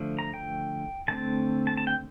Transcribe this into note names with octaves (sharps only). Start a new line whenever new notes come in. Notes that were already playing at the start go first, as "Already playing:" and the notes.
Already playing: D3 F3 A3
A#5
G5
D3 A3 C4 A5
A5
A5
G5